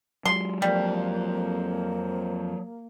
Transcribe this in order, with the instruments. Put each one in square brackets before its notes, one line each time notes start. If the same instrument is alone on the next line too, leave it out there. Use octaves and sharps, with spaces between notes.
[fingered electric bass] F#3 G#3 [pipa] C6
[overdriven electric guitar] F2 F3 [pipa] G3 [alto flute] A#3